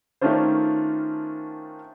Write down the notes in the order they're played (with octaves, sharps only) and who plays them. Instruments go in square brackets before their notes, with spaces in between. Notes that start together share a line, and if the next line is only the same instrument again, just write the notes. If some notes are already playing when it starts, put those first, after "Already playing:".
[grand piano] D#3 A3 C#4 D4 F4 C5